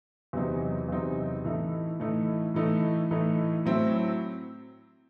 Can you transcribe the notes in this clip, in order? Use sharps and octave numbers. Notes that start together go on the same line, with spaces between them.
E2 C3 F#3 C4 D#4
E2 C3 F#3 C4 D#4
A2 E3 A3 D#4
A2 E3 A3 D#4
A2 E3 A3 D#4
A2 E3 A3 D#4
A2 F#3 C4 E4